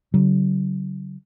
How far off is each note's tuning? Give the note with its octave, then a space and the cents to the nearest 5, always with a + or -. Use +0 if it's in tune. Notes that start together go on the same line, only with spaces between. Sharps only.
D3 -45 F#3 +30